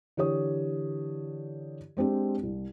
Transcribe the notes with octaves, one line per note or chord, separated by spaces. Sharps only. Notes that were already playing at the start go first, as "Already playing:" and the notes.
D3 E3 G4 C#5 D#6
G#3 C4 D4 G4
C2